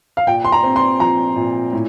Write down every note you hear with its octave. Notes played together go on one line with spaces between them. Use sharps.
F5
A#2 G5
C6
A#5
C4
C6
F3 A#5
A#2
A2